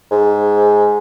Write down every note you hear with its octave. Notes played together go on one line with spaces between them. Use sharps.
G#2